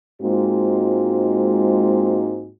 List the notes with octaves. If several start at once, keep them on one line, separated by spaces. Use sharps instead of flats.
G#2 G#3 A#3 C4 F4 F#4